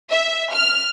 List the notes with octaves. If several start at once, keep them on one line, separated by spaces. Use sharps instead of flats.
E5
F6